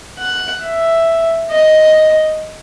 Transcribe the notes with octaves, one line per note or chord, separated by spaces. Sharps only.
F#5
E5
D#5